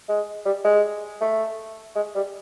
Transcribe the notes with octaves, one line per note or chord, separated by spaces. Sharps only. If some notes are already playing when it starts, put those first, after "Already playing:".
G#3
G3
G#3
A3
G#3
G3